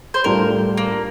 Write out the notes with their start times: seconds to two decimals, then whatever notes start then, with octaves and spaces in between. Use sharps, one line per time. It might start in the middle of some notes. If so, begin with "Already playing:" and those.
0.14 C5
0.24 A2 G3 D4 F4 A4 A#4
0.77 A#3